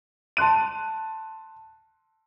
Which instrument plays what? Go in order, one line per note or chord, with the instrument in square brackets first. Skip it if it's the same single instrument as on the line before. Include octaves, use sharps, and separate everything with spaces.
[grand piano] A5 C6 F#6 D#7